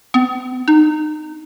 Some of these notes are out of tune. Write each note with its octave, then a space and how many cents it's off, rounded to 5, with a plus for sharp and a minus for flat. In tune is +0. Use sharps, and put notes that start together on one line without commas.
B3 +45
D#4 -25